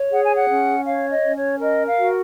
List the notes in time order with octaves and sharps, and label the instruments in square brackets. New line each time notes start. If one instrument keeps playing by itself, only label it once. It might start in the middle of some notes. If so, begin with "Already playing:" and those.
Already playing: [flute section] C#5
G#4 F#5
G#5
F#5
C#4
C#5 F5
D#5
C#4
C#5
A#4 D#5
F5
F#4